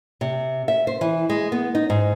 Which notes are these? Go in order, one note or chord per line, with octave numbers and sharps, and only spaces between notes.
C3
E5
C5
E3
G#3
B3
D#4
G#2